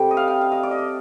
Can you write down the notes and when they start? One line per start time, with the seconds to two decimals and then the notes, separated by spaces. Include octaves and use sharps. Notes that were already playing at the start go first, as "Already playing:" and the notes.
Already playing: C3 G3 G4 A4 G5
0.11 D#5
0.17 F5
0.28 G5
0.41 F5
0.52 D#5
0.63 D5
0.71 D#5
0.79 D5